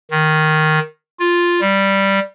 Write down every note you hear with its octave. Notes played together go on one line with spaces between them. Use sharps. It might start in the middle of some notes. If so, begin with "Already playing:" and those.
D#3
F4
G3